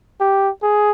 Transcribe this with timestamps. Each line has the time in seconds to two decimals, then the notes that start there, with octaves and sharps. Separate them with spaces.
0.20 G4
0.63 G#4